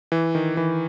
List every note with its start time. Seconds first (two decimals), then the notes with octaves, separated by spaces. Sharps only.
0.12 E3
0.35 D#3
0.57 E3